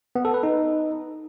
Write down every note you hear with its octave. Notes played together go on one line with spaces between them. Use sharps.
B3
A4
B4
D#4